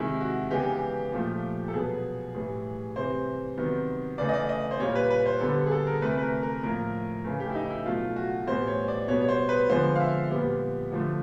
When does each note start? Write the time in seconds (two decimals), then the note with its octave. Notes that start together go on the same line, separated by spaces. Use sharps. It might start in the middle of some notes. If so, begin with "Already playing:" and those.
Already playing: C3 D#3 G#3 E4
0.21 F#4
0.51 C#3 E3 G#3 B3 G4
1.12 A#2 F3 A3
1.68 A4
1.73 B2 F#3 B3 G#4
2.34 A2 E3 G3
2.96 C3 E3 G3 C5
3.57 C3 D#3 F#3 B3
4.18 C#3 E3 A3 D5
4.29 D#5
4.33 D5
4.49 D#5
4.71 C5
4.80 A#2 G3 A#3 C#5
4.95 B4
5.10 B4
5.26 C5
5.41 D3 G3 B3 A4
5.67 G#4
5.71 A4
5.87 A#4
6.02 C3 E3 A3 B4
6.18 B4
6.22 A#4
6.43 A#4
6.63 A2 F3 A#3 A#4
7.25 C#3 E3 A3
7.40 G4
7.50 E4
7.55 D#4
7.70 E4
7.86 B2 F#3 A3 F4
8.16 F#4
8.47 A2 E3 G3 B3 C5
8.67 C#5
8.88 D5
9.08 B2 G3 B3 C#5
9.22 C#5
9.28 C5
9.49 B4
9.69 D3 F3 G#3 B3 C5
9.95 F5
10.00 E5
10.30 A#2 G3 B3
10.92 D3 F3 A3